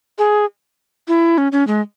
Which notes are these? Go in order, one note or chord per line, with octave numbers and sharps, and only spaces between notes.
G#4
E4
C#4
C#4
G#3